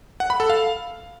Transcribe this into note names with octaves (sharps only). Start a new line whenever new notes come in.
F#5
B5
A4
F5